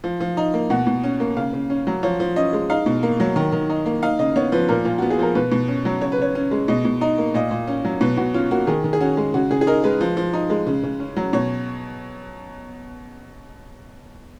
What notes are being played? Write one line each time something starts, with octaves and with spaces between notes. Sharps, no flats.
F3
F3
D#4
A#3
B2 F#5
B2
C#4
A#3
C#3 F5
C#3
C#4
F#3
F3 C#5
F3
C#4 D#5
G#3
D#4 F5
B2
A#3
F#3
D#3
D#3
D#4
A#3
D#4 F5
C#3 D#5
B3 C#5
F3 B4
A#2 A#4
A#2 F4
B3 F#4
G#4
F3 A#4
B2 B4
B2
C#4
F#3
C#3 C#5
B4
C#3 C#5
C#4
G#3
B2 D#5
B2
D#4
A#3
A#2 D#5
A#2
C#4
F#3
B2 B4
B2 F#4
C#4 F4
A#3 F#4
D#3 G#4
D#3
G#4
C#4 F#4
G#3
C#3 F#4
C#3 G#4
G#4
D#4 A#4
G#3 B4
F3
F3
D#4
G#3
C#3
C#3
C#4
F#3
B2 C#5